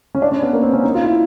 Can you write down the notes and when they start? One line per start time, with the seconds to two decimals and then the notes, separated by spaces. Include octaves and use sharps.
0.15 C#4
0.22 D4
0.31 C#4
0.43 B3
0.53 A#3
0.62 C4
0.73 C#4
0.83 D#4
0.94 F4
1.04 E4